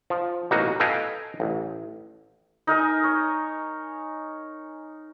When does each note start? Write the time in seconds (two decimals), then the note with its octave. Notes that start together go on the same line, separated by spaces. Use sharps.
0.10 F3
0.51 A1 B2 A#3 D#4 F#4
0.80 A4 B4 D#5 F5 G5 G#5
1.40 A1
2.67 D#4 A#4 D#5 G#5
3.04 C#5